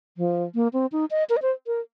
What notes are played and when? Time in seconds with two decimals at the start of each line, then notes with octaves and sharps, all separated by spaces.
0.17 F3
0.55 A#3
0.73 C4
0.92 D#4
1.11 D#5
1.30 A#4
1.37 D#5
1.42 C5
1.67 A#4